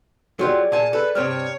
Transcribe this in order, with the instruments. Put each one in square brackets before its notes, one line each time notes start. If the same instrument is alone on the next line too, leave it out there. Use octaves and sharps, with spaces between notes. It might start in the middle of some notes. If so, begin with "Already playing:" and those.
[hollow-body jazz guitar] F#3 F4 G4 [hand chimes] G#4 D5
[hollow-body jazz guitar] A#2 G#5 [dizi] A5
[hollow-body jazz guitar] A4 [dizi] B4
[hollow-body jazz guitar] G2 C3 G3 [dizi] C#5 [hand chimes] F6